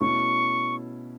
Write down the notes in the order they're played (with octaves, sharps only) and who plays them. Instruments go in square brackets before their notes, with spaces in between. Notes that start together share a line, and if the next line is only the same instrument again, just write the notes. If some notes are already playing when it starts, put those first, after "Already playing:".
[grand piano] B2 A3 C#4 E4 [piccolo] C#6